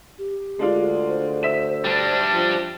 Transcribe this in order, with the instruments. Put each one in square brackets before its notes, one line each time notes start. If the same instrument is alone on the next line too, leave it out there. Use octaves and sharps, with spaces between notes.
[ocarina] G4
[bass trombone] D2 [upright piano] G#3 D4 F4
[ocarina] C5
[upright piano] E5 B6 E7
[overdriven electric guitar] G3 D4
[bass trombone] F3